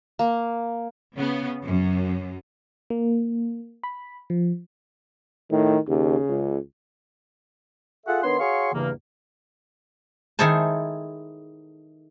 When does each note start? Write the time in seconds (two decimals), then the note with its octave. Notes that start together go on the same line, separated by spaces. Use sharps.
0.19 A#3
1.15 C#3 B3
1.65 F#2
2.90 A#3
3.84 B5
4.30 F3
5.51 A2 D#3
5.88 D#2 C#3
6.29 C#2
8.07 F4 G#4 A4 E5 F#5
8.24 D#3 B3 D4 C#5 C6
8.40 F#4 G#4 C#5 F5 C6 C#6
8.73 E2 G2 C#3 E3 A#3
10.39 D#3 E4 G#4 A4 C5 A5